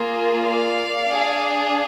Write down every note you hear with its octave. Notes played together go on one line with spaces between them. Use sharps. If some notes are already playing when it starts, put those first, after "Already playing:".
Already playing: A#3 F4 G#4
D5 F5
D4 G#4